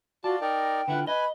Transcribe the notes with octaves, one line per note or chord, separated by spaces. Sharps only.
F4 F#4 D5 A5
D#4 A#4 D5 G5
D3 E4 F4 B4 F#5
B4 D#5 G#5 B5